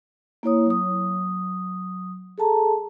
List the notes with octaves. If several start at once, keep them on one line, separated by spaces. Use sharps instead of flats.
A#3 E4 C#5 D#6
F#3 D#6
G#4 A4 A5 A#5